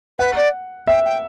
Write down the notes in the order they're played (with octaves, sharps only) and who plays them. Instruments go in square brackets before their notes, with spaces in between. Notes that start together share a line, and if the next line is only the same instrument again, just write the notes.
[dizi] B4 [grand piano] F#5
[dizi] D5
[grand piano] E5 [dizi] G5
[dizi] G5